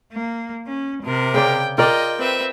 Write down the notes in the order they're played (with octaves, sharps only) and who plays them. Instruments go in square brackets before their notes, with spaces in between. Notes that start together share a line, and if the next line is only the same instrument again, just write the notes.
[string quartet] A#3
C#4
C3 A#4
[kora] C#3 D5 [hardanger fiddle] G5
[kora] F4 A#4 D5 [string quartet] D#5 [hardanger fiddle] G5
[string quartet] C4 B4 E5